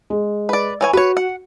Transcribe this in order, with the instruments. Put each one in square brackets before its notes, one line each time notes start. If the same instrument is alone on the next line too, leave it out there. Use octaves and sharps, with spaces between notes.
[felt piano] G#3
[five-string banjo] B4 D5
E3 C#5 G#5
[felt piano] F#4 [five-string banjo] B4 C#5
[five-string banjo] F#5